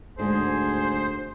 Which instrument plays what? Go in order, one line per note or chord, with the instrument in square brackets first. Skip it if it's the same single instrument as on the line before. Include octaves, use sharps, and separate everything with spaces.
[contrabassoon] D2 [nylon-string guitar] G#2 [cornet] G#4 [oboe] C5